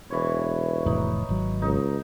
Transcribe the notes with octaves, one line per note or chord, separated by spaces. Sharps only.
E1 E3 C#5
F1 A2 E3 D#4
G#1 F#3
C#2 D#4